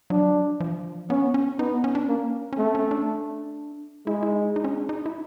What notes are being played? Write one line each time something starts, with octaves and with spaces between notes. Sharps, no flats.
F#3 D4
F3
B3 C#4
C#4
B3 D#4
C#4
D4
A#3 C#4
C#4
A3 C4
C#4
D4
G#3 E4
E4
D#4
D#4
C#4
D4
D#4
E4